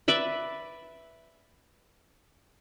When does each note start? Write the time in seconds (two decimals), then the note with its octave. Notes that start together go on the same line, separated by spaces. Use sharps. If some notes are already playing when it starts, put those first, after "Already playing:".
0.08 B4 D5 E5 B5